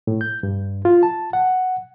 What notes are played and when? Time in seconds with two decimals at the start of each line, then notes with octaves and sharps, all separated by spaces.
0.07 A2
0.21 G6
0.43 G2
0.85 F4
1.03 A5
1.33 F#5